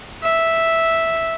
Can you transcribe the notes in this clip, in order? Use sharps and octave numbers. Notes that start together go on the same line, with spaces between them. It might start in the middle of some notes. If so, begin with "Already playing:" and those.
E5